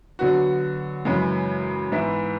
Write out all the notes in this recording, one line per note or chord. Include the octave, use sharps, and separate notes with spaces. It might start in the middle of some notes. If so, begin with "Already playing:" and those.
D3 F#3 B3 F#4
F#2 C#3 E3 G#3
G#2 E3 B3 E4